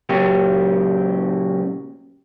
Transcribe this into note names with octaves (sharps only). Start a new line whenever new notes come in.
A#2 C#3 F#3 C#4 G4